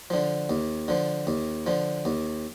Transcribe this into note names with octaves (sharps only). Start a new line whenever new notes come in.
D3 F3
D#2
D3 F3
D#2
D3 F3
D#2